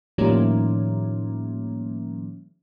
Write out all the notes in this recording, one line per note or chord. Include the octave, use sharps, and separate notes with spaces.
A2 D#3 F3 G3 A#3 C#4